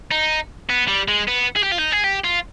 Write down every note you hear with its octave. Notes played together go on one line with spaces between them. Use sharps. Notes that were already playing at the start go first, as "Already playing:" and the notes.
D#4
B3
G3
G#3
B3
G#4
G4
F4
D#4
G#4
G4
F4